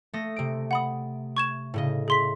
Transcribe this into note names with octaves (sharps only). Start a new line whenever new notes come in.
A3 D#6 A#6
C3 D7
F#5 B5 D#6
C#6 G#6 E7
A2 C#3 D#5
G#4 C6 B6